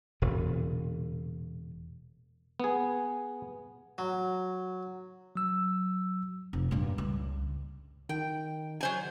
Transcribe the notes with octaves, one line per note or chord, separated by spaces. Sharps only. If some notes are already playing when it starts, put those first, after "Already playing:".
E1 A#2 C#3
B3 G#4
F#3
F#3 E6
F1
G2 A#2
C#2
D#3 G5
F#3 C5 G#5